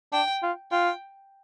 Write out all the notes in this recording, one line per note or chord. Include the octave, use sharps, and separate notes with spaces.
D4 G5
F4
F4 G5